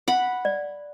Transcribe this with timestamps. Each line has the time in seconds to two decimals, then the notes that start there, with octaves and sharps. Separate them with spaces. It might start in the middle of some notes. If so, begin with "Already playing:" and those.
0.08 F#5 B5
0.45 D5